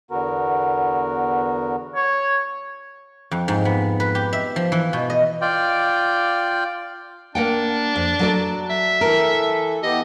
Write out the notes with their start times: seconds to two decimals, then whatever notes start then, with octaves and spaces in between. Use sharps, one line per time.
0.11 E2 D3 B3 F#4 A#4
1.95 C#5
3.31 F2
3.48 G#2
3.65 B3
4.00 B4
4.15 G4
4.33 E5
4.56 F3
4.72 E3
4.93 B2
5.10 D#5
5.41 F4 D5 G5
7.35 A#3 D4 F#5 G5
7.96 F2
8.19 F#3 A4 D5
8.70 E5
9.01 E3 A4 A#4
9.83 E3 B3 G4 D#5